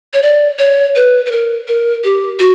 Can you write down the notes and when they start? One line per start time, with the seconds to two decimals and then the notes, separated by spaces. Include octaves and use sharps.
0.14 C#5
0.23 D5
0.59 C#5
0.96 B4
1.26 B4
1.31 A#4
1.68 A#4
2.04 G4
2.39 F#4